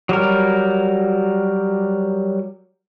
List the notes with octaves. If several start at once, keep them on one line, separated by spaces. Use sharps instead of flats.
F#3 G3 A#4